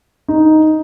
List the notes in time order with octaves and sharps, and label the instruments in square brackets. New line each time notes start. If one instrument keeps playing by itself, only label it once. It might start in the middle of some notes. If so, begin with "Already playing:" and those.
[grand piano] D#4